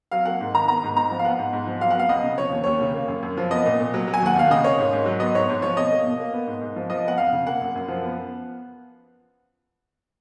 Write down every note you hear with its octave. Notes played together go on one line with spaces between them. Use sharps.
F#3 F5
A#3 F#5
G#2
D#3 A#5
B3 A#5
G#2
G#2 A#5
F3
F5
B3 F#5
G#2
G#2
F3
F#3 F5
F#5
B3 F5
C#2 D#5
C#3
F3 C#5
D#2
D#2 C#5
C#3
A#3
F#2
F#2
F3
B3 D#5
A#2
A#2
F#3
F#3
G#5
D#2 F#5
D#2 F5
C#3 D#5
A#3 C#5
G#2
G#2
F#3
B3 D#5
G#2 C#5
G#2
F3 C#5
B2 D#5
A#3
B2
A#3
B3
G#2
G#2
F3
F3 D#5
B3 F#5
F2 F5
C#3
A#3 F#5
F#2
F#2
F3
B3